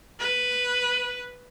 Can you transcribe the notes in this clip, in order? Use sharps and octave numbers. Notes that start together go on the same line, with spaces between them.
B4